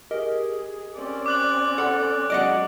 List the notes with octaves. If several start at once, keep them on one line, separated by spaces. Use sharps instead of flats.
G4 G#4 A#4 D#5
C4 C#4 D5
D6 F#6 F#7
A4 F#5 B5 E6
F#3 G#3 C#4 D5 D#5 F#5 D7